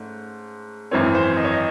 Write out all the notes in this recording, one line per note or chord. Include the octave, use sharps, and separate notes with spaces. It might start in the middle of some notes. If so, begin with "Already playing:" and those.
Already playing: G#2 A3 C#4
G#1 F#2 E3 C4 C#5
C5
D#5
C#5
D#5